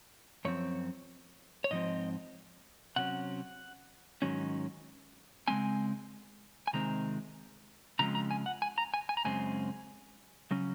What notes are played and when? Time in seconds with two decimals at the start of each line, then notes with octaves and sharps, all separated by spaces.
0.45 F#2 F3 C4 C#5
1.64 C#5
1.71 G#2 F3 C4 D#5
2.96 C3 F#3 C#4 F#5
4.22 G#2 D#3 F#3 C#4
5.48 C#3 G#3 C4 G#5
6.67 G#5
6.73 C3 D#3 G#3 C4 A#5
7.99 C#3 F3 G#3 C4 A#5
8.15 A#5
8.31 G#5
8.46 F#5
8.62 G#5
8.78 A#5
8.94 G#5
9.09 G#5
9.17 A#5
9.25 F#2 C#3 G#3 C4 G#5
10.51 C#3 F#3 C#4